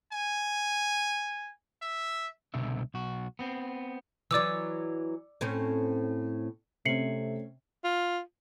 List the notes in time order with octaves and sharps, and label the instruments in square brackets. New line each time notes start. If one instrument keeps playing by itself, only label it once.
[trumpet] G#5
E5
[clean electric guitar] C2 B2 D3 E5
B1 F#4
B3 C4
[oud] E3 F#3 [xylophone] D5 D6 E6
[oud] A2 C4 C#4
[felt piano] C3 [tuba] A3 [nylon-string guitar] C4 C#4 [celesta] C7 C#7 F#7
[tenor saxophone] F4